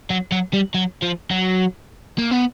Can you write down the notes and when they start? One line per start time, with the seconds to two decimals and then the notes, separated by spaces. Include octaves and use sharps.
0.10 F#3
0.32 F#3
0.53 G3
0.74 F#3
1.02 F3
1.31 F#3
2.18 A#3
2.31 B3